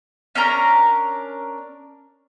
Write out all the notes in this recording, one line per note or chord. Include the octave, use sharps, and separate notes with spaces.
C#4 D4 A#4 A#5